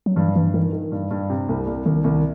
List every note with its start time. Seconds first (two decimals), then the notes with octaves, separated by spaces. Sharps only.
0.06 F#3
0.16 G2 E3
0.36 G2 E3
0.54 D#3 E3
0.73 D#3
0.92 G2
1.11 G2
1.30 C3
1.49 C2
1.67 C2
1.86 C2 D#3
2.04 C2